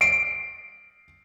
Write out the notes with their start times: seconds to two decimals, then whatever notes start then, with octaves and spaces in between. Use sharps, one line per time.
0.01 C7 D7